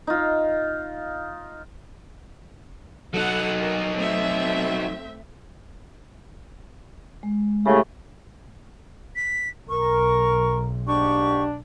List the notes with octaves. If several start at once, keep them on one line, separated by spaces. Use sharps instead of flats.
D#4 F4
F#3 D#4 A4 F#5
F#4 A#4
A3 C4 E5
G#3
A2 C#3 A3 G4
B6
B1 A#4 C#6
G#2 A#3 D4 G4 C#6